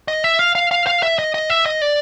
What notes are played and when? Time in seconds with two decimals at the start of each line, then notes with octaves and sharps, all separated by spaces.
0.08 D#5
0.24 E5
0.39 F5
0.55 F5
0.71 F5
0.87 F5
1.03 E5
1.19 D#5
1.34 D#5
1.50 E5
1.66 D#5
1.82 D5